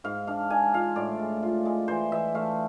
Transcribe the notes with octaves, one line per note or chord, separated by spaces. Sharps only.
G#2 F5
D4 F5
D4 G#5
F4 F5
A2 D5
G#3
F4
G#3
E3 C5
E3 E5
A3 F5